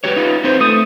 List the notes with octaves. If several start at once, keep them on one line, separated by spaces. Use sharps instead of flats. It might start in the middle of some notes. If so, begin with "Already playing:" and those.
F#4 G4 B4 C#5
D#4 F4
C4 D#4 B4 C5
A3 D#6